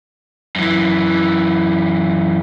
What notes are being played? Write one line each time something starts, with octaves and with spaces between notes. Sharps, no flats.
F#2 E3